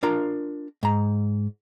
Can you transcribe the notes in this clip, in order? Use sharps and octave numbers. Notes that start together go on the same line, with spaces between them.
D4 F4 A#4 F5 A#5
G#2 A#5